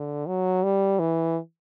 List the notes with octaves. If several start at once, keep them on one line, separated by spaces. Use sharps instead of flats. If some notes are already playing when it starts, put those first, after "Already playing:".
Already playing: D3
F#3
G3
E3